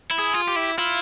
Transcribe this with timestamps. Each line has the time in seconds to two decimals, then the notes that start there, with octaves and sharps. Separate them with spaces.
0.11 E4
0.18 G#4
0.34 F4
0.48 G4
0.56 E4
0.78 E4 F4